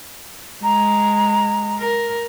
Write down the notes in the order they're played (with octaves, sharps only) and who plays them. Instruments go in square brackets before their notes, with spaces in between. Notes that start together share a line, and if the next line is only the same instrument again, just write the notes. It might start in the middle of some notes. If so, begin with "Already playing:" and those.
[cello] G#3 [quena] A#5
[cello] A#4